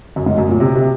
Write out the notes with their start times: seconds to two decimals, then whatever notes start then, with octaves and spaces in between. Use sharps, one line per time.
0.16 F#2
0.26 G#2
0.38 F#2
0.49 A#2
0.60 C3
0.75 C3